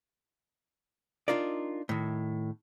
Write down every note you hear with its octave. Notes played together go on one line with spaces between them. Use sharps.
D4 D#4 F4 A#4 D5
A2 D#3